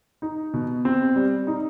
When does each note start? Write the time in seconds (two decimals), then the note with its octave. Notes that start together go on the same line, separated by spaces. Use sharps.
0.22 D#4
0.54 B2
0.85 C4
1.16 G3
1.47 D#4